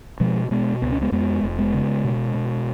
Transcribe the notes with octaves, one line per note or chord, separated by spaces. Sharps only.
B2 F3 G#3
B2 G#3 B3
C#2 B3
C#4
G#3 B3
F2 G#3 B3
F1
G#3 B3
C#3
B2
B2